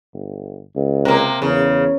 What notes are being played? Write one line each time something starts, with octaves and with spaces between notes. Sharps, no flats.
G1
C#2
C3 A#3
E2 C#3